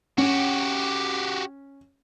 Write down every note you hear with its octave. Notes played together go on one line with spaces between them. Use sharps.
C#4 F#4 G4